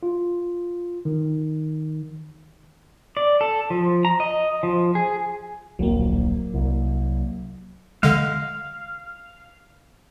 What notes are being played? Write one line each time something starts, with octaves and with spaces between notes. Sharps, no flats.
F4
D#3
D5
A4
F3
A#5
D#5
F3
G#4
D1 A#1 F#3 A#3
C2
D3 G#3 F5